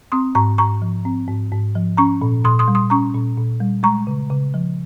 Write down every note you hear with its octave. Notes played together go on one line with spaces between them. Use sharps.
C4 C6 D#6
G#2 A#5 C#6
G#2 A#5 C#6
F3
C4
G#2
G#2
F3
C#4 A#5 C#6
A#2
A#2 C6 D#6
C6 D#6
G3
C6 D#6
C#4 A#5 C#6
A#2
A#2
G3
G#3 A#5 C#6
C#3
C#3
F3